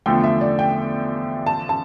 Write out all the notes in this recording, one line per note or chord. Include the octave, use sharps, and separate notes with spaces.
E2 D3 F3 A3 G5
E5
D5
G5
A5
A5